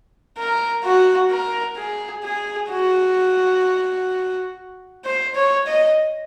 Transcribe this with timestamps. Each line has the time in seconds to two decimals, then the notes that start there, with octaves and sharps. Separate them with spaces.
0.38 A#4
0.84 F#4
1.31 A#4
1.77 G#4
2.24 G#4
2.70 F#4
5.05 C5
5.35 C#5
5.67 D#5